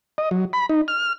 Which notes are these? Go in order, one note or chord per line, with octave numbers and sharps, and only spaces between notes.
D#5
F#3
B5
D#4
F6